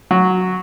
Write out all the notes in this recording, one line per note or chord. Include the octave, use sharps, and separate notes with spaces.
F#3